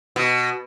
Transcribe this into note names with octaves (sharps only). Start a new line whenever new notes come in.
B2